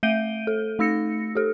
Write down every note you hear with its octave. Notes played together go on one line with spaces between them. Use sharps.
A3 E5 G6 D7 D#7 G7
A4
A3 D#4 E6 A#6 C#7
G4 A4